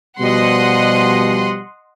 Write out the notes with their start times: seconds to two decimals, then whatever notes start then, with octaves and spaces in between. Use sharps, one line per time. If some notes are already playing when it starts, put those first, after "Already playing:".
0.20 B2 F3 G3 D#5 F#5 C6